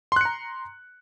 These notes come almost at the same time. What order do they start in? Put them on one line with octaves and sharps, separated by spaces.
C6 F#6 C#7 A#5